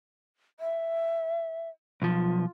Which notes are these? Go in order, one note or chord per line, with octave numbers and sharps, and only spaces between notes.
E5
B1 F3 F4